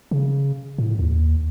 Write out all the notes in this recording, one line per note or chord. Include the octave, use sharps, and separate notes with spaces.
C#3
A2
D#2